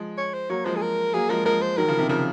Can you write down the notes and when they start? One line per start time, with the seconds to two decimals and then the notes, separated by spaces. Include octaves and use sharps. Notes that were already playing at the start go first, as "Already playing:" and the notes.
Already playing: F3 G#3
0.18 C#5
0.34 C5
0.49 F#3 A#3 C#5
0.65 F3 G#3 C5
0.76 G#4
0.82 A#4
1.14 F#3 A#3 G#4
1.29 F3 G#3 A#4
1.45 F3 G#3 A#4
1.62 C5
1.77 D#3 F#3 A#4
1.88 C#3 F3
1.99 C3 D#3
2.09 C#3 F3 A#4